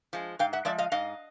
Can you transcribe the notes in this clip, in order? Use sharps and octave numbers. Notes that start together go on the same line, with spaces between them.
F3 G#3
G#2 F5 G5
E5 F#5
F3 G#3 D5 E5
D#5 F5
G#2 D#5 F5